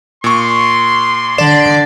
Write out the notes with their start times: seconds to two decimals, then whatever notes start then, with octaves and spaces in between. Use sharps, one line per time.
0.24 A#2 C6 C#6
1.38 D3 D5 E7